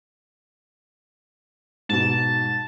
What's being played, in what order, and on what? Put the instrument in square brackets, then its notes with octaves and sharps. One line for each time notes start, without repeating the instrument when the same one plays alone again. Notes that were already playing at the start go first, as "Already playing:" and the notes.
[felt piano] G#2 B2 [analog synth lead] A5